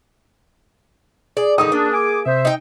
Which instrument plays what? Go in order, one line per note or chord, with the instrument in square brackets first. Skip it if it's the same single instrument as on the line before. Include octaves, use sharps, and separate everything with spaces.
[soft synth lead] G#4 [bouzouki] D5
[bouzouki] D3 D#3 D#4 [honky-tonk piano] D#6
[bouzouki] A#3 [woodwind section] D4
[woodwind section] G#5 D6
[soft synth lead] C3 [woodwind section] C5 E5
[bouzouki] D#4 G5